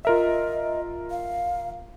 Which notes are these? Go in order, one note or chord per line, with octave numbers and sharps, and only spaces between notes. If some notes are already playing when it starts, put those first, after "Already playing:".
F4 A#4 D#5 E5
F5